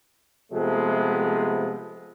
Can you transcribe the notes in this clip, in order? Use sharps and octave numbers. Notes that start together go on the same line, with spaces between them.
C3 F3 G#3 A3 B3